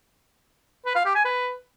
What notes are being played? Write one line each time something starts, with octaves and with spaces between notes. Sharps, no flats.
B4
F5
G4
G#5
B4